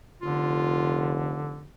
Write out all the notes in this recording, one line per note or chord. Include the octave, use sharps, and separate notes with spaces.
F1 D3 F4